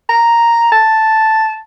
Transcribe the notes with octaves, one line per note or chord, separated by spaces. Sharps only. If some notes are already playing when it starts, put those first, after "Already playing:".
A#5
A5